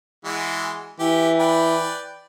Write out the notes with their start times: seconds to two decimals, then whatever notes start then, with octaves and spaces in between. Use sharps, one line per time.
0.25 E3 G#3 F#4
1.00 E3 G4
1.40 B4 D5 G5